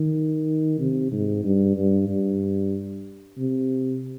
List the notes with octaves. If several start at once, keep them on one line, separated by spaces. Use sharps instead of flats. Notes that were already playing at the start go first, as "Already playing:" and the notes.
Already playing: D#3
C3
G#2
G2
G2
G2
C3